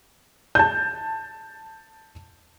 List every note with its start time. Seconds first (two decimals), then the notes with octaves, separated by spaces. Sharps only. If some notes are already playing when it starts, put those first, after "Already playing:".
0.55 A5 G6